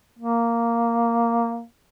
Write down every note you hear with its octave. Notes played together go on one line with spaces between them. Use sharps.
A#3